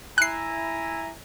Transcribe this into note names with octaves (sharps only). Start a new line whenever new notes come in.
E4 G#5 A#5 F#6 C7